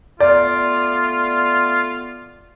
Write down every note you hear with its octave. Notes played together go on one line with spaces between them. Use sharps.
A3 B3 F4 D5